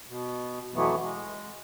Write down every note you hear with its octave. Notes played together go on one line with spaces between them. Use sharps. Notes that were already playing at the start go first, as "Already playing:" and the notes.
B2
F2 B2 E3 F#3 A3 B3
G#3